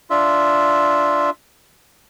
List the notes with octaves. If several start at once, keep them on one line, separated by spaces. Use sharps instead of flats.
D4 F4 E5